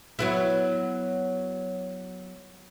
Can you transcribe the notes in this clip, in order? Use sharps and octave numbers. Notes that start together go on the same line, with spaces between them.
F#3 B3 E4